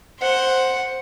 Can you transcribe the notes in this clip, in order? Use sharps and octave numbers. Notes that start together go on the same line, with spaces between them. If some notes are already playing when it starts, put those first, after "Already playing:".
C5 F#5